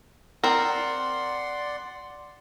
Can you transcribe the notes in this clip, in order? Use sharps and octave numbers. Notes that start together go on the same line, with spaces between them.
C4 A#4 D5 F#5 C6